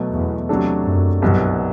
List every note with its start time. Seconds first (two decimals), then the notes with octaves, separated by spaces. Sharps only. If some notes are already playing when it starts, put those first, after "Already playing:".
Already playing: B2 F#3 A3
0.12 E2
0.49 C3 F#3 A3 D4 A4
0.85 F#2
1.22 C2 G2 B2 F#3